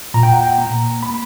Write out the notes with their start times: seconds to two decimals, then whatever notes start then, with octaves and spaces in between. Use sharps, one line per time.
0.14 A#2 A#5
0.23 G5
0.32 F#5
0.41 G5
0.58 A#3 A#5
1.03 A#3 B5